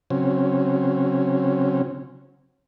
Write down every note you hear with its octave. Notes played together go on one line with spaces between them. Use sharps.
C#3 F#3 C4 C#4